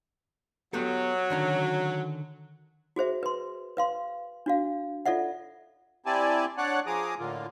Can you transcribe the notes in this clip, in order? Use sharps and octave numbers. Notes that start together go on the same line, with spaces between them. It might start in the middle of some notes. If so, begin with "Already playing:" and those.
F#3 B3 G4 A4
D3 D#3 C#4
F#4 G#4 C5 E5
B4 C6
B4 F5 C6
D4 F#4 F5
F4 A4 D5 E5 F#5
C4 E4 G4 D5 G#5 A5
D4 C#5 D5 F#5 F#6
F3 G#4 A#5 D6 D#6
A2 D3 A#3 F4